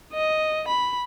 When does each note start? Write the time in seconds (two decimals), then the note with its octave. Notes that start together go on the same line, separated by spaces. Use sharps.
0.14 D#5
0.68 B5